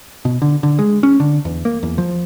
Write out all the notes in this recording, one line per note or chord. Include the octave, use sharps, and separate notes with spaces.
B2
D3
D3
G#3
C#4
D3
E2
A#3
E2
F3